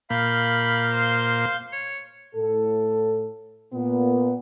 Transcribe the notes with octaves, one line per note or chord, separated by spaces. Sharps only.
A#2 A#3 F5 B5 G6
C5
C#5
A2 A4
A#2 B3